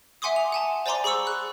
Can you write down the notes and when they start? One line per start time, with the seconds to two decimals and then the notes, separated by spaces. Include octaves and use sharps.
0.22 E5 F#5 G#5 C6 D6 D#6
0.36 F7
0.52 F#5 G#5 A5
0.86 C5 D5 G#5 A#5 C6 D6
1.04 G#4 B5 C#6 E6 C#7
1.27 F#6